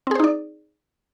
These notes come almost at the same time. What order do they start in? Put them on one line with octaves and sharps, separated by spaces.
C4 G#4 C5 D#4 D5